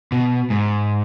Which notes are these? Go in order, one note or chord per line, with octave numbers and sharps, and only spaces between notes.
B2
G#2